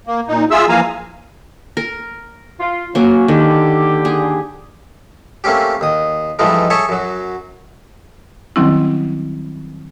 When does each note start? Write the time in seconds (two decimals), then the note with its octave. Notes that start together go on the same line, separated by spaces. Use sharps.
0.07 A#3
0.28 A#2 D#4
0.51 F4 G#4 E5 E6
0.69 E3 F3 A#3 F5 G#5 A#5
1.77 A#4
2.60 F4
2.95 F#3 A#3 C#4
3.28 D3 D#3 G4
4.05 G#4
5.44 A3 A#3 C4 C#4 G4
5.81 D#2 D#6
6.39 G2 E3 F3 G#3 A3 D#4
6.70 G#4 A4 C#5 E5 G#5 C#6
6.89 F#2 F#3
8.56 D#3 F#3 G3 C4 C#4 E4